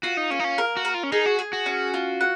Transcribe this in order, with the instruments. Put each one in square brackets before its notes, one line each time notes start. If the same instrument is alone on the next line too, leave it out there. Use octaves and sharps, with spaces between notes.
[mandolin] F4 [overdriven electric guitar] F#4
[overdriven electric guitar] D#4
[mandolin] A#3 [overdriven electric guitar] C#4
[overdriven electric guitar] D#4
C#4
[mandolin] A#4
[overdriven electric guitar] F#4
[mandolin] A#4
[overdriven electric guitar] F4
C#4
[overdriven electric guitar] D#4 [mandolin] G#4
[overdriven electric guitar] F#4
[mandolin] G#4
[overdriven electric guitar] F#4
[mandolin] C#4
F4
F#5